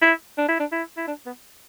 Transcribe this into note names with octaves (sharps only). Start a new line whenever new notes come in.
E4
D4
E4
D4
E4
E4
D4
B3